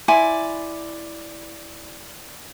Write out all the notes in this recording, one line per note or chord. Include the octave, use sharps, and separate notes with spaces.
E4 D5 G#5 C6